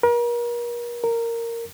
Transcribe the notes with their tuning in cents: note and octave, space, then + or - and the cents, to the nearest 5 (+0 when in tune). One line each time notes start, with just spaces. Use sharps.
A#4 +40
A#4 -10